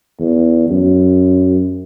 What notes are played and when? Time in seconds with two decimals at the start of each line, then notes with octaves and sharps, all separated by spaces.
0.20 E2
0.70 F#2